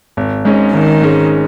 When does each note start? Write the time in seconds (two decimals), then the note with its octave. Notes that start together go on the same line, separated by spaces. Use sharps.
0.17 G#1
0.45 G#2 G#3 C#4 G#4
0.73 G#1 D#3
1.01 G#2 G#3 C#4 G#4